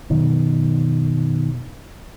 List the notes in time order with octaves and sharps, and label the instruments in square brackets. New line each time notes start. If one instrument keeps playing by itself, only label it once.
[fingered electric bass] F#2 B2 D#3